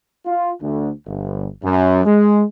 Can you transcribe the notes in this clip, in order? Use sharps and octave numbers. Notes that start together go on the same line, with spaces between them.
F4
D2
G1
F#2
G#3